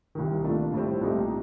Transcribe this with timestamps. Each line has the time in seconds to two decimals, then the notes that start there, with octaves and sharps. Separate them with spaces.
0.15 C2 C3 D#3
0.44 A#2 A3 D4 F4
0.73 A2 G3 C4
1.01 C2 A#2 A3 D#4 G4